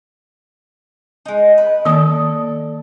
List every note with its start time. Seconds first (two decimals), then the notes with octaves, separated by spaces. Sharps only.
1.25 G#3 D#4
1.58 B4
1.85 D#3 A#3 A4 D5 D#6